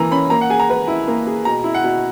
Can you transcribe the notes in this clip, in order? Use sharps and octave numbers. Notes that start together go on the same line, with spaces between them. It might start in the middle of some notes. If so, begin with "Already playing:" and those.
Already playing: E3 A#3 A#5
C#4 B5
A#3 A#5
F#5
G#4 G#5
A#5
B4
E4
A#3
G#4
B2 A#5
E4
F#5
B2